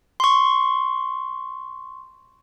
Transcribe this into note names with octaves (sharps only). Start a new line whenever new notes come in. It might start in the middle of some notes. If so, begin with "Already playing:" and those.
C6 C#6